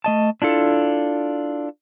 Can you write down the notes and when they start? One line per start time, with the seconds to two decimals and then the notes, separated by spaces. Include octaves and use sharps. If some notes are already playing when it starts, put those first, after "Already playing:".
0.04 A3 D#5 A5
0.42 D4 E4 F4 A4